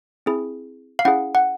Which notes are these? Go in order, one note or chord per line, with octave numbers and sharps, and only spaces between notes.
C4 E4 G#4
F5
C#4 E4 G#4 F#5
F#5